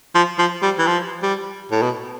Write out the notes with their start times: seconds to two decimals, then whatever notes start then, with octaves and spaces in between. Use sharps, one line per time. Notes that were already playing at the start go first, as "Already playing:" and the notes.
0.15 F3
0.38 F3
0.62 G3
0.79 E3
0.87 F3
1.22 G3
1.71 A2
1.82 B2